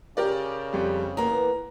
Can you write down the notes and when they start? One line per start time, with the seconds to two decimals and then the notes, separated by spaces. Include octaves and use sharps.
0.17 C#3 G4 A#4 D5
0.73 F2 G3
1.17 E3 A#3 B3 A#5